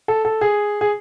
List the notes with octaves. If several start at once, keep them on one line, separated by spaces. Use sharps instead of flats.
A4
A4
G#4
G#4